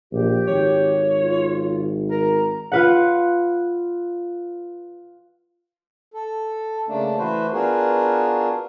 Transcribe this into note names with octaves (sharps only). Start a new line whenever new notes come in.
A#1 G4
G#1 C#5
F4
A#4 A#5
F4 B4 F#5
A4
C#3 A3 A#3 D4
E3 A3 F#4 B4 C5
B3 D4 F4 F#4 G#4 A#4